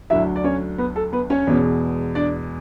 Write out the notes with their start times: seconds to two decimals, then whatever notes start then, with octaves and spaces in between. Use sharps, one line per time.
0.10 D2 D3 F#3 E4 E5
0.36 D5
0.44 C#4 C#5
0.78 B3 B4
0.96 A4
1.13 B3 B4
1.30 C#4 C#5
1.47 E2 B2 G#3
2.15 D4 D5